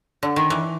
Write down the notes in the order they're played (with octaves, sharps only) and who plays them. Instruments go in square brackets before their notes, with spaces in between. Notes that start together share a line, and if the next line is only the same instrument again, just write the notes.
[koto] D3
D#3
E3